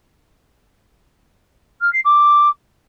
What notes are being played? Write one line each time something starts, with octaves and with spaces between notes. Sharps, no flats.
F6
C7
D6